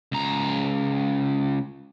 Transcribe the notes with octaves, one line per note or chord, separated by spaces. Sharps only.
C#2 A#5